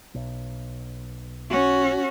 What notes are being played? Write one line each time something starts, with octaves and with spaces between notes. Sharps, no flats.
B1
C#4 F#4